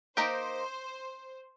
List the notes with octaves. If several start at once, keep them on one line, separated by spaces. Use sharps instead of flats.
A#3 D#4 G4 A#4 C5